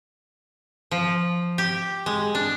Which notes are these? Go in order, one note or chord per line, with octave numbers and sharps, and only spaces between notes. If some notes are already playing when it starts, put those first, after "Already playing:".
F3
G4
G#3
D4